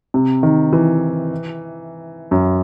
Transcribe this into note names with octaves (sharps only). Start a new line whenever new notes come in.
C3
D#3
E3
F#2